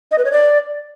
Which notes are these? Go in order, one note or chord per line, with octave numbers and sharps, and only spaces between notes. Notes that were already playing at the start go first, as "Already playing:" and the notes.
D#5
B4
C#5
D5